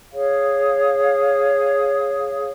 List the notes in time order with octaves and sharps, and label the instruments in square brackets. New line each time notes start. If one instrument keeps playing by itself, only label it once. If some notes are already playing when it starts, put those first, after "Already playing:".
[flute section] G#4 C#5 F5 D#6